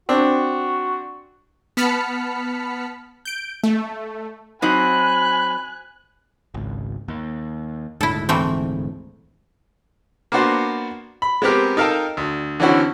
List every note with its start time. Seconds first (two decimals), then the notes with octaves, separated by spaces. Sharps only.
0.09 C4 D4 F#4
1.77 B3 A5 B5 F6 B6 C#7
3.25 G6 D7
3.63 A3
4.62 F#3 C4 D#4 G#5 B5 F#6
6.54 G#1 C#2
7.08 D#2
8.01 D#1 D2 G#2 E4 A4
8.29 E3 A3 C4
10.32 A#3 B3 D4 F#4 C5
11.22 B5
11.42 G#3 B3 C4 G4 A#4
11.77 D#4 A4 A#4 F5 G5 A5
12.17 D2
12.60 D3 E3 C4 C#4 E4 F#4